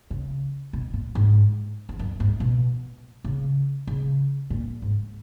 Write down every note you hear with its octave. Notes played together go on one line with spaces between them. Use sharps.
C#3
B2
A#2
G#2
E2
F#2
G#2
B2
C#3
C#3
A#2
G#2